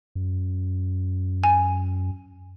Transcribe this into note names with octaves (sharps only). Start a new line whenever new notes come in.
F#2
G#5